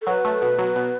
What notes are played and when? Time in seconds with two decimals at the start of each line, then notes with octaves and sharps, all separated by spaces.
0.02 A4
0.07 F#3 B4
0.25 A3
0.42 B2
0.59 F#3
0.76 B2